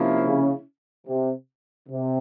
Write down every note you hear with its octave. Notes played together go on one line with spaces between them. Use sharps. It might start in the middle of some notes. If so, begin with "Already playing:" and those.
Already playing: C3 F3 A#3 C#4 E4
C#3
C3
C3